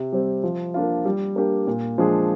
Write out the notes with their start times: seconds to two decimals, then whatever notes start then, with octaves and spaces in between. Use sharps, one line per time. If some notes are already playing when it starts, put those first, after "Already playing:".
Already playing: C3
0.12 G3 C4
0.44 F3
0.74 A#3 D4 F4
1.05 G3
1.36 A#3 D4 G4
1.67 A#2
1.98 F3 G#3 D4 G#4